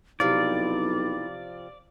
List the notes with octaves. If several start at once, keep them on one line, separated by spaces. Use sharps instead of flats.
B1 C3 F3 E4 D5